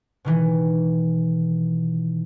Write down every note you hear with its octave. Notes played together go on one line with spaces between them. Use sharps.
B2 D#3 E3